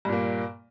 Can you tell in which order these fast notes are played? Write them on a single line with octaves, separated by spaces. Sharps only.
G2 A#2 A#3